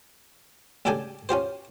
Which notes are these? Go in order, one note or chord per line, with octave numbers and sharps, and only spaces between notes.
A1 C#3 D4 G4 A4 G#5
C#4 F4 G4 C5